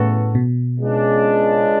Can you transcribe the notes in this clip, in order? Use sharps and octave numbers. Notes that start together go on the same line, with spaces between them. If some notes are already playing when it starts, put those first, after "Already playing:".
Already playing: A2 C#3 E3 B3 F#4 A4
B2
C#2 C#3 G#3 D4